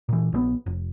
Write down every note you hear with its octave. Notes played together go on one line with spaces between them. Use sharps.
A#2 E3
A#1 D3 B3
F1